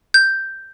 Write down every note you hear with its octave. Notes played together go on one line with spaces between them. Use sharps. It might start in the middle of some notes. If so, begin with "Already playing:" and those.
G6